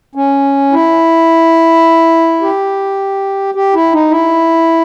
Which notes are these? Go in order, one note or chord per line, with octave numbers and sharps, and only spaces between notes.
C#4
E4
G4
G4
E4
D#4
E4